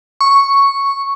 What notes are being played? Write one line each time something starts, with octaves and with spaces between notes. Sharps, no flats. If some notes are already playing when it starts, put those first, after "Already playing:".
C#6